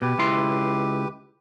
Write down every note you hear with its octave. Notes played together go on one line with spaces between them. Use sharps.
B2 G4 B4
C#2 E4 C6